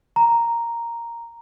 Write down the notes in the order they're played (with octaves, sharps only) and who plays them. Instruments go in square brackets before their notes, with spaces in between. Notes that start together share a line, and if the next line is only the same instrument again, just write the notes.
[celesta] A#5